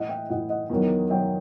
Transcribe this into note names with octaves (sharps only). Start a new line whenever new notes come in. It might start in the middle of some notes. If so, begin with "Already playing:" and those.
Already playing: A2 E3 D#5 F#5
E5 G5
A2 E3 D#5 F#5
D#5 F#5
E2 D#3 F#3
D#3 F#3 E5 G5